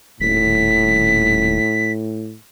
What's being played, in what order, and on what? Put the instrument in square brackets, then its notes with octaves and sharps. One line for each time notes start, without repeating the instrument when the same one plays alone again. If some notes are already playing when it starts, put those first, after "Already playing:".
[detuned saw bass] D#1 [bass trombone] A2 [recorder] B6